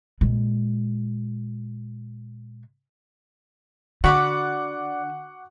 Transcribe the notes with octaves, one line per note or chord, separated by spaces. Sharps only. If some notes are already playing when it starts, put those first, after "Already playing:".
A#2 G#3
D3 F#4 D5 F#5 B5 C#6 D6